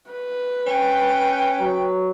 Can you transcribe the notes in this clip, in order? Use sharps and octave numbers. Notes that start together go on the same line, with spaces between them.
B4
C#4 G5
F#3